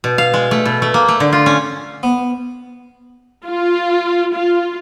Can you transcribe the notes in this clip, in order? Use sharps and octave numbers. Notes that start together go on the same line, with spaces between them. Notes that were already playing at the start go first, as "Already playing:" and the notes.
B2
F5
G#3
A3
B2
A3
A#3
A3
D3
F4
C#4
B3
F4
F4